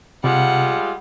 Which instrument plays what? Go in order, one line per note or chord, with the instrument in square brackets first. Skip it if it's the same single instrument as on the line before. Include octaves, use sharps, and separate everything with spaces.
[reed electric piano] C3 [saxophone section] G3 G#3 F4 [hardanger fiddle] F#5